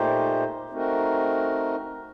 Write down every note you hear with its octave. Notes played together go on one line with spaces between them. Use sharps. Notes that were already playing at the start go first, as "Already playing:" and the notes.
Already playing: A#2 A3 D#4 G4 C5
A3 C4 D#4 F#4 A#4